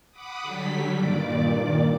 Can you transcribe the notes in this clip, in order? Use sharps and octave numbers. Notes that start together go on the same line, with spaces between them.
F#5 B5 D6 D#6
D3 F#3 G3 B6
G2 A#2 D#3 D5 D6